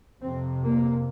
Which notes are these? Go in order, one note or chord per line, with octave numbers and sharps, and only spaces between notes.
F2 C3 C4
A#3